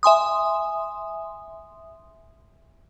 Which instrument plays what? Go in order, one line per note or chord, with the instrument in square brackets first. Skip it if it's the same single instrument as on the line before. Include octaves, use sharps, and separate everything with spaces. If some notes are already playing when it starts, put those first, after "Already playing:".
[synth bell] E5 G#5 C6 D#6